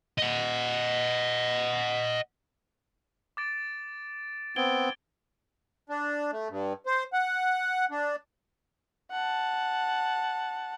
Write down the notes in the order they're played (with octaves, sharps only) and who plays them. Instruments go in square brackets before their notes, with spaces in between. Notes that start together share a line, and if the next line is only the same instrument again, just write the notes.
[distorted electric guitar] D#5 F#5
[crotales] D6 A6 D7
[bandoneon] B3 C4 [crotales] G#6 D7 G7
[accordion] D4
A3
G2
C5
F#5
D4
[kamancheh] F#5 A5